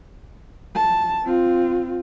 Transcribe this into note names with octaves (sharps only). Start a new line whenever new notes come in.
A5
C4 F4